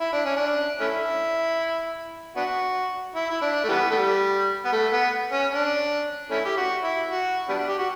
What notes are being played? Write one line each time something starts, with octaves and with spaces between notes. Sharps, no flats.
E4
D4
C#4
D4
A3 C#4 E4
B3 D4 F#4
E4
E4
D4
A3
E3 G3 B3
A3
G3
B3
A3
B3
C#4
D4
A3 C#4 E4
G4
F#4
E4
F#4
G3 B3 D4
G4
F#4